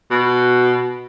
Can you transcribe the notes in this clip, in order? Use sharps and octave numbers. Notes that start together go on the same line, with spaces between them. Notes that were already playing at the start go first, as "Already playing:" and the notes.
B2